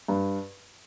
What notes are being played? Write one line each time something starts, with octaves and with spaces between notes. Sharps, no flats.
G2